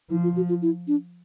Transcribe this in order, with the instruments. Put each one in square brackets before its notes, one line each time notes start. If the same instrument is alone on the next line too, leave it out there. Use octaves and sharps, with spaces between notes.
[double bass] F3 [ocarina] E4
[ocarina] F4
F#4
F4
E4
D4